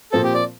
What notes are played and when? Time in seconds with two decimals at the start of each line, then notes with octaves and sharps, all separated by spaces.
0.12 A#2 F3 C4 A4
0.23 G4
0.34 D5